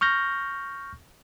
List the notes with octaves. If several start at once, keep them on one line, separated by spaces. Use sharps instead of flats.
C#6 F6 G6 A#6